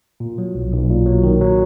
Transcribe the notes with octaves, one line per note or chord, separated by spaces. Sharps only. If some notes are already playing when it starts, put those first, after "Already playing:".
A#2
F#3
B1
B1
A#2
F#3
D#3
F#3